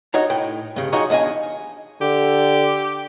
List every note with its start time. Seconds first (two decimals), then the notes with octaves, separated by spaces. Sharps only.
0.14 D#4 F#4 C#5 A#5
0.30 A2 G5
0.76 G2 C#3
0.93 F3 D#4 F#4 G#4 C#5 D#5
1.10 E2 D4 D#5 F5 G#5
2.01 D3 G4